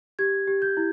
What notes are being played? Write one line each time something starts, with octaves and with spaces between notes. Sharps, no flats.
G4 G#6
G4
G6
E4